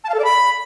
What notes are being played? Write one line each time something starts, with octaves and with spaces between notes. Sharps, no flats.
A5
F5
A4
D5
B5